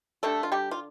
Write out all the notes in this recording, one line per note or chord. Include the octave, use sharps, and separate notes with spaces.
D3 G3 A3 D4 A4
F4
G3 G4
F4